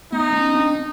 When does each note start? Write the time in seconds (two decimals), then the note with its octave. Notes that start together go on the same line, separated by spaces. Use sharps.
0.12 A3 B3 D#4
0.34 B3 C#4
0.55 C4 D4